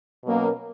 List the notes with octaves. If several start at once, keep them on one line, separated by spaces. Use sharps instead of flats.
B2 F#3 A#3 C#4